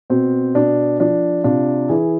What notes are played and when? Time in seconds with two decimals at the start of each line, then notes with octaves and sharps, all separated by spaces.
0.10 B2 C4
0.54 B2 D4
1.00 F3 D4
1.44 C3 D4 F4
1.89 E3 E4 G#4